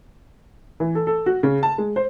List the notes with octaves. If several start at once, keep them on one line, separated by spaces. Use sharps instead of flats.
E3
A4
A4
F#4
C#3
A5
G#3
C5